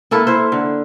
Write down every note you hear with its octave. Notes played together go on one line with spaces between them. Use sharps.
A#3 E4 A4 B4
E4 C5
D3